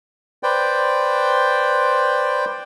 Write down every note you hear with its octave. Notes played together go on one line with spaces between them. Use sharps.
B4 C5 D5 G5